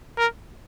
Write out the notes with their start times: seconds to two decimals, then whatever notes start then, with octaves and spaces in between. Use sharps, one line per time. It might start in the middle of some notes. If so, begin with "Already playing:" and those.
0.18 A#4